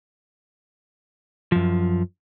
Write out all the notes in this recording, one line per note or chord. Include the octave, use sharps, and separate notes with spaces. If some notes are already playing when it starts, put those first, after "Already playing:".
F#2 F3